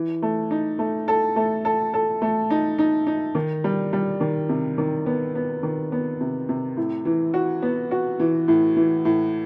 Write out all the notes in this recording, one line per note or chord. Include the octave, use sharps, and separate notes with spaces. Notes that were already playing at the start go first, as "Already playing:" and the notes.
Already playing: E3
A3
D#4
A3
A4
A3
A4
A4
A3
D#4
D#4
D#4
D#3
G3
G3
D#3
C3
D#3
B3
B3
D#3
B3
C3
C3
A2
E3
F#4
B3
F#4
E3
A2
E3
A2